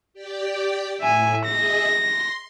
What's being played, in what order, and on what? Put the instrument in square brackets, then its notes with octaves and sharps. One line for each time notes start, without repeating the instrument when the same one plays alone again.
[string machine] G4 D5 G5
[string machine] A2 [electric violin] E5 G#5
[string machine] G#4 D#5 E5 [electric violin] A#6
[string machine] C6